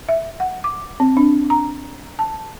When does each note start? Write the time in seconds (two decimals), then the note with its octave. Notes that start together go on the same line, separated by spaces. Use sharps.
0.09 E5
0.40 F#5
0.64 D6
1.00 C4
1.17 D4
1.50 A#5
2.19 A5